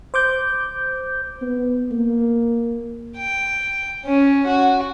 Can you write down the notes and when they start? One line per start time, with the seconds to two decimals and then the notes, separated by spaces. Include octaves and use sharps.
0.14 C5 D6 G6
1.41 B3
1.91 A#3
3.18 G5
4.05 C#4
4.47 F#4